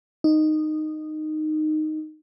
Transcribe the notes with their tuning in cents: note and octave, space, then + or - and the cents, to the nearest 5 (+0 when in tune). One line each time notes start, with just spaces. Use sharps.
D#4 -10